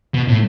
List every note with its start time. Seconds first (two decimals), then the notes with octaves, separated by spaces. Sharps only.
0.14 B2
0.28 A2